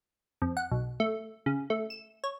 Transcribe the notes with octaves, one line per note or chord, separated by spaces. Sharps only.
F2
F#5
B1
A3
C#3
A3
E7
C#5